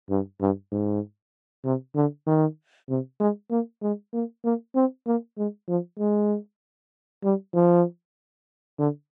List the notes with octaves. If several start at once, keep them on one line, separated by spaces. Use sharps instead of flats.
G2
G2
G#2
C3
D3
D#3
C3
G#3
A#3
G#3
A#3
A#3
C4
A#3
G#3
F3
G#3
G3
F3
D3